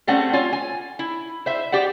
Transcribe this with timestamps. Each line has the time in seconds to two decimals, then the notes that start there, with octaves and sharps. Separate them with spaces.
0.07 G3 A3 C4 C#4 F#5
0.33 F4 C#5 G#5
0.52 G#5
0.99 E4
1.46 C5 E5
1.72 G4 C5 D5 F#5